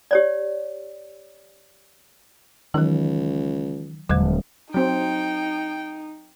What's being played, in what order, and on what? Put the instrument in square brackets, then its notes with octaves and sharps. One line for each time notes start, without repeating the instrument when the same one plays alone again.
[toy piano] G4 C#5 D5
[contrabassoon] C#2 [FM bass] D#3 [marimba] E3 F#3
[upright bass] D#1 [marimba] D3 F#3 G#3
[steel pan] F#3 C4 [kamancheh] D#4 [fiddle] G5